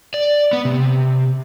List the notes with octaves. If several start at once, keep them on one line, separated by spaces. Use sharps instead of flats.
D5
B3
C3